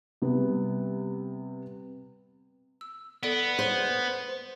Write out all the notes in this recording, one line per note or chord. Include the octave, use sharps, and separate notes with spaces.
C3 G3 B3
E6
B3 A4 D5 D7
C5